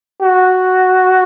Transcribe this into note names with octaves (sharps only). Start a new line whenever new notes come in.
F#4